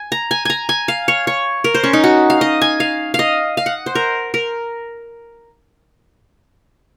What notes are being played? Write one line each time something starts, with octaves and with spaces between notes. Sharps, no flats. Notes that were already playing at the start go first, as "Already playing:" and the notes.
Already playing: G#5
A#5
G#5
G#5 A#5
G#5
F5
C#5
C#5
A#4
C5
C#4
D#4
F#4
F5
D#5
G#5
F5
F5
D#5
F5
F#5
C5
A#4
A#4